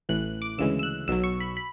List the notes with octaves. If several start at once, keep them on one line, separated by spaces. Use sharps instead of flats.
A1 A2 E3 F#6
D6
D2 C#3 E3 G#3 E6
E6
F#6
B1 B2 F#3 E6
C#6
B5
B5